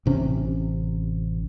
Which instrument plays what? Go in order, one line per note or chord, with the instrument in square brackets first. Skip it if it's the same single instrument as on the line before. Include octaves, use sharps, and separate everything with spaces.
[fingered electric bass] A1 C3 C#4